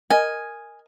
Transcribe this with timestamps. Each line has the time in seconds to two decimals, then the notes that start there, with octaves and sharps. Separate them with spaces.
0.10 A#4 D#5 G#5